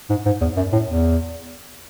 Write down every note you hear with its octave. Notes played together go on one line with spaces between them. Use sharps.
G#2
G#2
E2
F#2
A2
E2